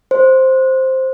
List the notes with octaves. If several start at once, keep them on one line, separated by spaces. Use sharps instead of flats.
C5